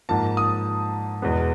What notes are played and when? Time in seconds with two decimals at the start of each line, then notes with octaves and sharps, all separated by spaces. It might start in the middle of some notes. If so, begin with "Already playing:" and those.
0.09 G#2 F3 A#3 A5
0.37 D#6
1.22 E2 B2 G#3 B3